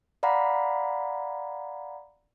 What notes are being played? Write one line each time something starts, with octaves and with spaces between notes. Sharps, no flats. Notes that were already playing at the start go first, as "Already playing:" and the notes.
D5 F5 F#5 A#5 B5